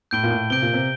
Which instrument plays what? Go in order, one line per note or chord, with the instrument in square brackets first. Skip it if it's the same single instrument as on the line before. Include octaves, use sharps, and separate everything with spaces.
[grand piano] A2 [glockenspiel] G6 D7 G7
[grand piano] A#2
A2
[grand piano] C3 [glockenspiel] G6 D7 G7
[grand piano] A#2
C3